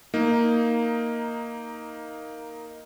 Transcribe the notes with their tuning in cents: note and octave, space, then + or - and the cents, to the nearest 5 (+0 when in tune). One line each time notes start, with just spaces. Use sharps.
A#3 +0 D#4 +10